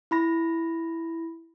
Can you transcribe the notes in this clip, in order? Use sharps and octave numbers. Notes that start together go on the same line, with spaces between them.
E4 B5 A#6